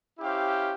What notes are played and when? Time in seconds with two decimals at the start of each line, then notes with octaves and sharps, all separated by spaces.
0.18 C#4 E4 G4 C5 F5